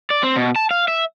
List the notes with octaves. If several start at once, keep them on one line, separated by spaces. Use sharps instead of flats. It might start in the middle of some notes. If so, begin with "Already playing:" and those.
D5
C4
B2
A5
F5
E5